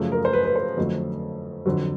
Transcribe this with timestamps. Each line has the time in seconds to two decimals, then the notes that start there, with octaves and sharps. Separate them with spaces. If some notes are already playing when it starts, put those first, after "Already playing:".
Already playing: F#2 C#3 F3 A3
0.12 A#4
0.25 C5
0.33 B4
0.45 B4
0.56 C5
0.77 F2 D3 F#3 A3
1.66 F2 D3 F#3